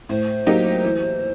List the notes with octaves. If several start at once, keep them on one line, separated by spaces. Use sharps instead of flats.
A2 C5
F#3 A#3 D#4 G4
E3